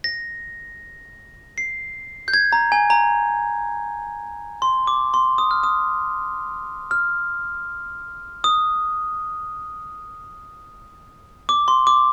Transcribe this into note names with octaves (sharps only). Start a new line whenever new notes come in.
A#6
C7
G6
G#6
A#5
G#5
A#5
C6
D6
C6
D#6
F6
D#6
F6
D#6
D6
C6
D6